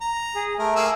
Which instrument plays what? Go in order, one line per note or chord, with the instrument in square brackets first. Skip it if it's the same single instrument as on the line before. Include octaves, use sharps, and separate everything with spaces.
[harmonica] A#5
[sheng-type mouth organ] G#4
[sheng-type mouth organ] A3 [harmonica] A#4
[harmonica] A#3 G#4 E6